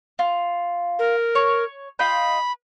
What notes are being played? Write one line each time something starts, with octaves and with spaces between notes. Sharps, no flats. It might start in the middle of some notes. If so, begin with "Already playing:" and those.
F4
A#4
C#5
F4 D#5 G5 B5